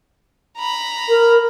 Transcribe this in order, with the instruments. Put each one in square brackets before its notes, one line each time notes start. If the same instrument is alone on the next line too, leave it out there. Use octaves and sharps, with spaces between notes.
[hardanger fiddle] A#5 B5
[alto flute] A#4